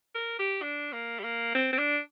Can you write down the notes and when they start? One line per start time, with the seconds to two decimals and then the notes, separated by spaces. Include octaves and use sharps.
0.15 A#4
0.39 G4
0.62 D4
0.93 A#3
1.19 G3
1.24 A#3
1.55 C4
1.73 C4
1.78 D4